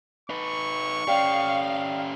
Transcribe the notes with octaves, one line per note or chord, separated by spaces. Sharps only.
D#4 B4 C#6
C#4 G4 D5 F5 G5